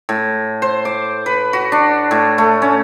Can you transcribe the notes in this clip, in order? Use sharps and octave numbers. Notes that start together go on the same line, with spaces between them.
A2
C5
D6
B4
F#4
D4
A2
A3
C#4